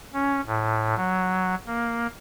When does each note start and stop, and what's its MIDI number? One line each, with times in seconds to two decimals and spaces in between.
0.14 0.41 61
0.46 0.95 45
0.96 1.55 54
1.67 2.07 58